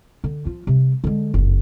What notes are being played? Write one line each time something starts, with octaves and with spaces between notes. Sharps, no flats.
D3
F3 F4
C3 G3
D3 G#3
F#1 F2